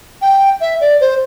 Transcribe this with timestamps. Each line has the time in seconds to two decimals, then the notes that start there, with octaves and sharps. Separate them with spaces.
0.22 G5
0.61 E5
0.81 D5
1.01 C5